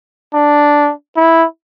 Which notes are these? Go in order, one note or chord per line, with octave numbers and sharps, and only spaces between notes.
D4
E4